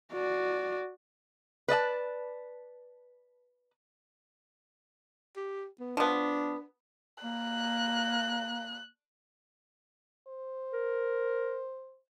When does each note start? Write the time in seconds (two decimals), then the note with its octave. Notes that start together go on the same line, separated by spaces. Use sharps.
0.13 F#4 D5
1.68 B4 D5 D#5 A5
5.36 G4
5.80 B3
5.97 F3 B3 D4
7.24 A#3 F#6
10.27 C5
10.73 A#4